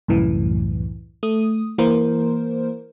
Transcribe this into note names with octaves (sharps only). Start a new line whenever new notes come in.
C2 F#2 A2 E3
A3 D#6
E3 A#3 A#4 C5